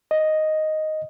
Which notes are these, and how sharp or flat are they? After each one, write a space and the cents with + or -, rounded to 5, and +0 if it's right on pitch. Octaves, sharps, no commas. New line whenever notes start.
D#5 +0